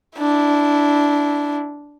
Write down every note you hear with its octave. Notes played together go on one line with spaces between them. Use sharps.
D4 E4